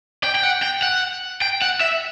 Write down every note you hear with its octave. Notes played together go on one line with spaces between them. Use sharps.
G5
G5
F#5
G5
F#5
G5
F#5
E5